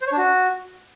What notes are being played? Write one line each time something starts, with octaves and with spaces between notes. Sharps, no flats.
C5
C#5
D4
F#4